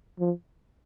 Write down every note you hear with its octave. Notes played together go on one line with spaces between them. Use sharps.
F3